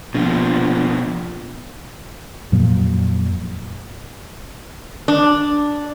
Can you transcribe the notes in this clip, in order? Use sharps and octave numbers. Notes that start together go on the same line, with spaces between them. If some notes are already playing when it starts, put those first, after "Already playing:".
A#1 B2 F3
F2 A#2 F#3
D4